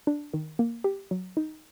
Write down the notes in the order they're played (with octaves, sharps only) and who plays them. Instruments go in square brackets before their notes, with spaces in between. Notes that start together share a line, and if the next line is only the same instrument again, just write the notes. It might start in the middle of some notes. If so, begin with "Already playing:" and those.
[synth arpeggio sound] D4
D#3
A#3
G4
F#3
D#4